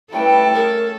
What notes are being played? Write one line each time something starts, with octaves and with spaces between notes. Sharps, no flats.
G3 A3 C#4 E4 A4 B4 G5
C#4 G#4 A#4